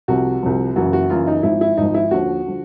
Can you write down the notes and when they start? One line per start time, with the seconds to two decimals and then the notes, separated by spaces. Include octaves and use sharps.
0.08 C2 C3 F3 F#4
0.43 C2 C3 F3
0.75 F#1 F#2 C#3 E3 F#4
0.93 F#4
1.10 F#1 F#2 C#3 E3 F4
1.27 D#4
1.43 G#1 G#2 F3 E4
1.61 E4
1.77 G#1 G#2 F3 D#4
1.94 E4
2.11 D#2 D3 F3 F#4
2.46 D3 F3